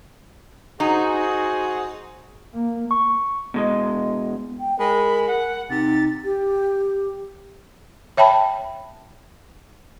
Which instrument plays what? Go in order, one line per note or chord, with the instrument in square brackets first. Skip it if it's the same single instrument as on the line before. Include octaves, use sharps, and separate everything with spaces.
[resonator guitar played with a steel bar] D#4 [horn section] F#4 G#4 C5
[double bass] A#3
[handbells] C#6
[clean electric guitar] B2 G#3 D#5
[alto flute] G5
[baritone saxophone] G#3 [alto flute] A#4 [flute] B5
[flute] F#5
[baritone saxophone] C3 [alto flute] D#4 [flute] A6
[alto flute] G4
[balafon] C#5 E5 G5 A5 B5